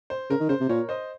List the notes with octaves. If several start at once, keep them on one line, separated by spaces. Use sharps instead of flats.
C5
C#3 A#4
D#3
C#3 C5
C3
A#2 A#4 C#5
C5 D#5